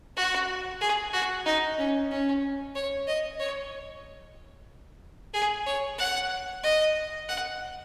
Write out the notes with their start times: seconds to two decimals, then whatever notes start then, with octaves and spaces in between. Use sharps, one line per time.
0.16 F#4
0.81 G#4
1.13 F#4
1.46 D#4
1.78 C#4
2.11 C#4
2.75 C#5
3.07 D#5
3.39 C#5
5.34 G#4
5.66 C#5
5.98 F#5
6.63 D#5
7.28 F#5